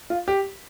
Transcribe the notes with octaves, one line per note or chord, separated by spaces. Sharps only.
F4
G4